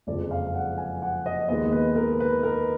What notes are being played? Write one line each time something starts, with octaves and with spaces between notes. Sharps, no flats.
F#1 F2 F3 G#3 D5
F5
F#5
G#5
F#5
D#5
D#2 D#3 G#3 B3 D#5
B4
A#4
B4
A#4